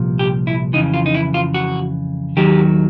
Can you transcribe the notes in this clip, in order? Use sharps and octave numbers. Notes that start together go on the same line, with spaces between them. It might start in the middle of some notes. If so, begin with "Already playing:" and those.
Already playing: C2 A#2 F3
G4
E4
F2 C#3 E3 D#4
F4
D#4
E4
F4
F#4
D#2 D#3 F#3 G4